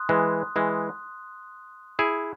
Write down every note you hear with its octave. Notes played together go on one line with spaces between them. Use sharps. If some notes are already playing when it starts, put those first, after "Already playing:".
Already playing: C6 D#6 F#6
E3 G#3
E3 G#3
E4 G#4